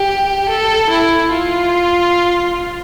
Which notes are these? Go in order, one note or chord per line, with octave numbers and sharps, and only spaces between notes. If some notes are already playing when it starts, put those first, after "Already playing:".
Already playing: G4
A4
E4
F4